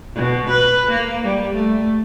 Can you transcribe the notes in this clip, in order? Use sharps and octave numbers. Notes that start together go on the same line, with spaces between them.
B2
B4
A#3
G3
A3